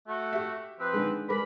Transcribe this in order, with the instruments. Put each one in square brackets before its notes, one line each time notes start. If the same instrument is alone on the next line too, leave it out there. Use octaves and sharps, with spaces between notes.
[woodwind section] A3 F#4
[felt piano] G4 E5
[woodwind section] F3 C4 B4
[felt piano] D3 D#3 G#3
[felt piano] G#3 A#4 B4 [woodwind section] D5 B5